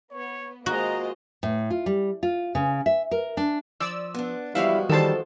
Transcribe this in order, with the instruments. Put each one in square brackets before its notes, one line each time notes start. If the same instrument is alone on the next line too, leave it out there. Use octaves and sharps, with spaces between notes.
[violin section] B3 [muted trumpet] C#5
[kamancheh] G#3 D#5 [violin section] A#3 F4 C5 [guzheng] F#4 [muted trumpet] A#5
[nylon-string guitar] A2
F4
G3
F4
C#3
E5
A#4
D4
[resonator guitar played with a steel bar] F3 [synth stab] D5 E6
[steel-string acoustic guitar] B3 D4
[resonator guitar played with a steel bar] E3 E4 [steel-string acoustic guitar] F3 G#3 F#4 [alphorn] G3 [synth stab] F5
[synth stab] D#3 E3 A5 [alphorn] G3 [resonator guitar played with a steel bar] A4 C5